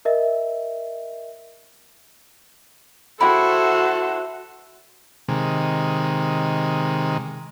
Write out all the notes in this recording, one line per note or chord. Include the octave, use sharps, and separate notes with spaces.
A#4 D#5 E5
E4 F#4 G#4 A4 C5 G5 B5
C3 D#3 G#3